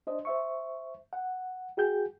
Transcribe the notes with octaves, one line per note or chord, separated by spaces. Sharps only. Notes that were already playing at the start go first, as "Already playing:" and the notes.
D4 C5 D#5
C5 E5 C#6
F#5
F#4 G#4 G5 G6